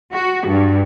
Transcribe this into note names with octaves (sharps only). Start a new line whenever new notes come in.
F#4
G2